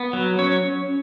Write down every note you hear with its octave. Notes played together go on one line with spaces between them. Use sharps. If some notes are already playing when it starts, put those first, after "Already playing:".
Already playing: B3
F#3
C#4 C#5